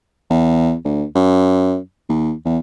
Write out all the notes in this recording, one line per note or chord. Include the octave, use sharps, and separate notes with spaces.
E2
D2
F#2
D#2
E2